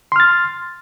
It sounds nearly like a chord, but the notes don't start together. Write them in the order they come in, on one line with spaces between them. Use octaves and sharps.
C6 F6 A6